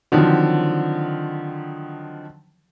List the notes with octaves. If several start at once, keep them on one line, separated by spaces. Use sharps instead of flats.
D3 D#3 F3 F#3 C4